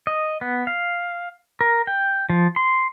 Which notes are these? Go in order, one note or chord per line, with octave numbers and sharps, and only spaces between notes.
D#5
B3
F5
A#4
G5
F3
C6